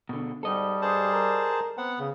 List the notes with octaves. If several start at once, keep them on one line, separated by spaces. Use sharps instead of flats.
B2 D3
G#2 G3 A4 D#5
G2 G#4 C5 A5
A#4
B3 C4 F#5
C#3 B3